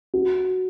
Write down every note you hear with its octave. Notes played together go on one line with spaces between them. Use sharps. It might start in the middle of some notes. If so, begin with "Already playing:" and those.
F#4